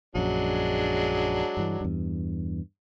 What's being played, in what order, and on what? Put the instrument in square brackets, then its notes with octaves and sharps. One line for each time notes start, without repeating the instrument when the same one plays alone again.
[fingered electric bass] A#1 F#2 [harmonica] F#3 G#3 D4
[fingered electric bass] G2 E3
E2 G2